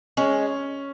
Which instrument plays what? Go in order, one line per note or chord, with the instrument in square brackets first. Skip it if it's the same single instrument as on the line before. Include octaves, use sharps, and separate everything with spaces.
[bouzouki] G#3 [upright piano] C#4